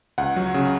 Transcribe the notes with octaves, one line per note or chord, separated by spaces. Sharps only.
C#2 F#5
F#3
C#3